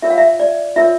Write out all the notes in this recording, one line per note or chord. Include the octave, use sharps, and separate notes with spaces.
F4 A#4 C#5 E5
F5
E5
D5
F4 A#4 C#5 E5